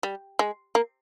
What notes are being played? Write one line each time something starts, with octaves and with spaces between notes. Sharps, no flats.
G3
G#3
A#3